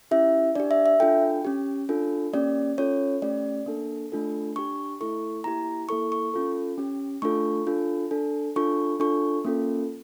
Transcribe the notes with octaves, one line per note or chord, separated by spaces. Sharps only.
C#4 E4 G4 E5
D4 G4 D5
E5
E5
D4 F4 A4 G5
C#4 G4
D4 F4 A4
A#3 C#4 G4 D5
C#4 F4 A4 C#5
A3 C#4 G4 D5
A#3 D4 A4
A3 D4 F4 A4
D4 G4 C#6
A3 E4 A4 C#6
A#3 E4 G4 A#5
A#3 E4 A4 C#6
C#6
C#4 F4 A4
C#4 G4
A3 D4 F4 A4 C#6
D4 F4 A4
D4 A4
D4 F4 A4 C#6
D4 F4 A4 C#6
A#3 C#4 F4 A4